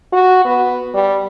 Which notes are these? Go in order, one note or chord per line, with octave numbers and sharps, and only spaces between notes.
F#4
B3
G3